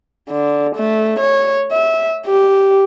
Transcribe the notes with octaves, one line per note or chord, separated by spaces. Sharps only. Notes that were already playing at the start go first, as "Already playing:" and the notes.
D3
A3
C#5
E5
G4